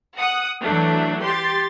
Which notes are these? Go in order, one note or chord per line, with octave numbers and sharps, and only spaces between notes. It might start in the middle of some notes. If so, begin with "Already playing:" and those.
F#5 D#6 F#6
E3 F#3 A3 D4
G4 C6 A6